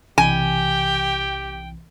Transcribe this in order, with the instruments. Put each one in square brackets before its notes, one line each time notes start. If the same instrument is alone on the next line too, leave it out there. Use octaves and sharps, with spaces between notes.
[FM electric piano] B1 C3 E3 [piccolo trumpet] G4 [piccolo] G5 [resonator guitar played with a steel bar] G#5